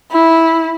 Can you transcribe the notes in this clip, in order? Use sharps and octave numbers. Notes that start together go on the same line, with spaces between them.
E4